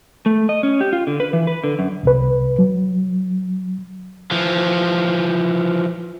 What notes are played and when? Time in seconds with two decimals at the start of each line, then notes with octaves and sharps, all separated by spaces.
0.26 A3
0.49 D#5
0.63 C#4
0.81 G4
0.93 F4
1.07 D3
1.20 B4
1.33 E3
1.47 B4
1.64 D3
1.79 F#2
2.03 C2 C3 B4
2.59 F#3
4.31 E3 F3